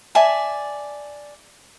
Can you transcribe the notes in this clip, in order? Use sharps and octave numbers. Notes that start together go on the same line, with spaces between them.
D5 E5 G#5 A5